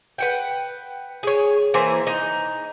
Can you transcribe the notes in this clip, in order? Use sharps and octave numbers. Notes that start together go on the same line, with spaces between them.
B4 F#5 G5
G#4 C#5
E3 A#3 C5 G#5
D#4